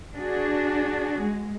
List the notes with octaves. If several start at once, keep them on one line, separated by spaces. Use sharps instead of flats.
D4 F#4 G#4
G#3